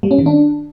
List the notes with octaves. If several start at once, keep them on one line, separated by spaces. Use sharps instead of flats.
G3
C#4
D#3
D4